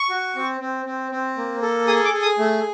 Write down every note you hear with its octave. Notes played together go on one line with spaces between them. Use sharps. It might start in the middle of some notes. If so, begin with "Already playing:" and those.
Already playing: C#6
F#4
C4
C4
C4
C4
A#3
A4
G#4 D#6
D6
G#4
D#6
A3